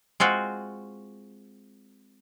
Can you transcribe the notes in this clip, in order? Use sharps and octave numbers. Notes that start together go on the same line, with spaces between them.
G#3 C4 F4 F#4